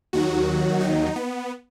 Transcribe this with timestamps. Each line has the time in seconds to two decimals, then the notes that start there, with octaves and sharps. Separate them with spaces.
0.13 D#2 D#3 F#3 F#4
0.81 D#4
1.16 B3